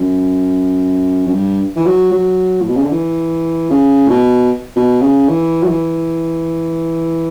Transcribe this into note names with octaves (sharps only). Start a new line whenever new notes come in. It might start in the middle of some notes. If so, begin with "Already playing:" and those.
Already playing: F#2
F#2
G2
E3
F#3
F#3
A2
B2
C#3
D3
E3
C#3
A2
B2
B2
C#3
E3
F#3
E3